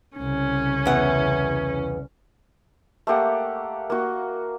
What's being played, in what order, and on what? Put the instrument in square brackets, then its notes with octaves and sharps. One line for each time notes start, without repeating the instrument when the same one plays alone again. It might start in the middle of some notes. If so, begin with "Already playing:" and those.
[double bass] C2 C#3 [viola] C#4
[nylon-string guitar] E2 F#5
[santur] A3 A#3 G4 F#5
A#3 F#4